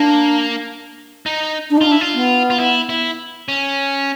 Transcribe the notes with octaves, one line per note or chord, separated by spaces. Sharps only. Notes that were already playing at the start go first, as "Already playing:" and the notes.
Already playing: A#3 D4
D#4
D4
D#4
D4 F4
E4
F4
B3
F4
E4
E4
C#4